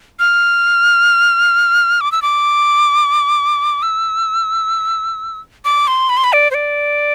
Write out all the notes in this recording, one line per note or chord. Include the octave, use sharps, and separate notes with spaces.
F6
D6
E6
D6
E6
D6
C6
B5
C6
B5
D5
C5
D5